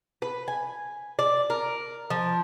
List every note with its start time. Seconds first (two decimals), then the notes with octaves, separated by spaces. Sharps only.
0.22 B4
0.48 G#5
1.19 D5
1.50 A#4
2.10 F3